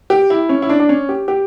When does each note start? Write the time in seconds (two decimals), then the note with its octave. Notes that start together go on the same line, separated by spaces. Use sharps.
0.10 G4
0.30 E4
0.49 C#4
0.62 E4
0.69 D4
0.80 D4
0.89 C#4
1.09 G4
1.28 G4